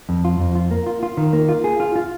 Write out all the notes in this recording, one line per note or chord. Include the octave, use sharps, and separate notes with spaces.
F2
F4
F2
F4
A#3
F4
F4
D#3
A#3
F4
G#4
F4
F4